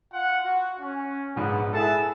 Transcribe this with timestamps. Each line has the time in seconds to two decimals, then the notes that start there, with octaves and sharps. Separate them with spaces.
0.12 F4 F#5
0.43 F#4 F#5
0.80 C#4
1.36 A#1 G#2 B3
1.73 E4 G#4 A4 B4 E5 A5